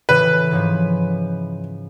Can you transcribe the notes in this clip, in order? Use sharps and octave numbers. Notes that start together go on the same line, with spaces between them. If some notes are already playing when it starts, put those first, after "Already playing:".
A2 C#3 E3 B4
G#2 C#3 F3